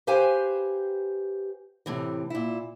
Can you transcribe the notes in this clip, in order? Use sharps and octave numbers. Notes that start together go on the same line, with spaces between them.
G4 B4 C5 F5 G5 G#5
A2 C3 E3
A#2 E4